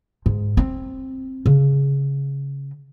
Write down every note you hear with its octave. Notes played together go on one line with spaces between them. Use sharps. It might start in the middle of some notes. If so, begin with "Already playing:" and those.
G#2
C4
C#3